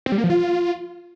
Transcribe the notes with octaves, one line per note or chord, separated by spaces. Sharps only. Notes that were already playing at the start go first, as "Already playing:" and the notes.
C4
G3
A#3
F3
F4